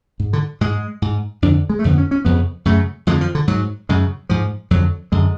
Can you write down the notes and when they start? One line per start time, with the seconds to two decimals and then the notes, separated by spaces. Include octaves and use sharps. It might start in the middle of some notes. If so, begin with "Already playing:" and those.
0.20 G#2
0.33 D3
0.61 G#2 G#3
1.02 G#2
1.42 F2 D3 D4
1.70 G#3
1.79 A3
1.85 F2 D3 B3
1.98 C#4
2.11 C#4
2.25 F2 C#3 B3
2.65 F#2 C#3 A3
3.07 F2 D3 G#3
3.21 F3
3.35 D3
3.48 G#2 F#3
3.89 F#2 C#3 G#3
4.29 G#2 F3
4.71 F2 D3 F#3
5.12 F#2 D3 G#3